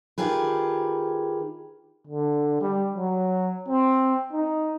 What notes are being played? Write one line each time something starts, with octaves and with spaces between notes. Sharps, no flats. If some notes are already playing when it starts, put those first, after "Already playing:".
D#3 F4 G4 G#4 B4
D3
G3
F#3
C4
D#4